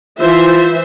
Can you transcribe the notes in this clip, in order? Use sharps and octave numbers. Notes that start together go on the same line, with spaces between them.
E3 F4 C5 E5